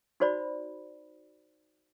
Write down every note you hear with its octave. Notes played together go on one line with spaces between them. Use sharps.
D#4 F#4 C5 D5 B5